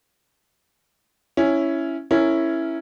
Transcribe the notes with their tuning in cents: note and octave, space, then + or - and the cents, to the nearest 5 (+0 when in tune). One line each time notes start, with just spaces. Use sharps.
C#4 +0 E4 +0
C#4 -5 E4 +0 A#4 -10